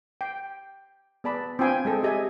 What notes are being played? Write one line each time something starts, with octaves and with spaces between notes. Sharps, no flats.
G5
B3 G#4 D5 A5 B5
C4 D4 F4 G5 G#5 B5
G#3 G#4 A4 C5
G4 D#5 E5 G#5